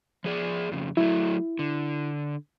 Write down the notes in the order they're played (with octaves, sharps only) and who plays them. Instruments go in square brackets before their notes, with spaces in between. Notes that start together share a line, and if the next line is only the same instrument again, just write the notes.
[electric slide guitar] F3 G#4 D5
F2 C#3
[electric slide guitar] F#3 A3 [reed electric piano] E4
[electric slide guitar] D3